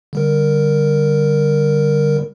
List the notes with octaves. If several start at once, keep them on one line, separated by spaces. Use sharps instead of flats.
D3 G3 A#4